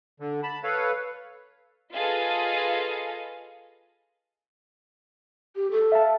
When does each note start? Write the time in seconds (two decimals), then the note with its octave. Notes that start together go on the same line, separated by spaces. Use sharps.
0.20 D3
0.43 A5 B5
0.63 A4 B4 C#5 F5
1.94 F4 G#4 A4 B4 D#5 F5
5.56 G4
5.71 A4
5.92 E5 F5 A5